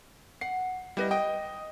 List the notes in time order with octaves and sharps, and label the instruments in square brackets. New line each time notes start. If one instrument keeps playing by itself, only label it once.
[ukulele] F#5 [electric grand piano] C7
[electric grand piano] G3 [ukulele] E4 B4 D#5
[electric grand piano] D#5 [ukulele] G5